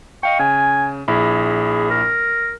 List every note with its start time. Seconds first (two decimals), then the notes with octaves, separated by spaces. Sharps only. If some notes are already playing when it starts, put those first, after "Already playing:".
0.23 D#5 F5 G5 C#6
0.39 C#3 G#5
1.08 A#1 E4 G#4 B5
1.90 A#4